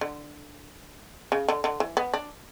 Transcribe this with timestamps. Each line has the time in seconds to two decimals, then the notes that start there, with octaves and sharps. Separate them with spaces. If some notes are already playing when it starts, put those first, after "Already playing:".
0.01 D3
1.32 C#3
1.48 D3
1.64 D3
1.80 E3
1.97 B3
2.14 D4